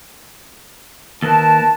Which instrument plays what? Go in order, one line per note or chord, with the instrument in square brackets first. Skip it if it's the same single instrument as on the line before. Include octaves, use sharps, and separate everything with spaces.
[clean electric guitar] D#2 [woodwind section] A#4 B4 A5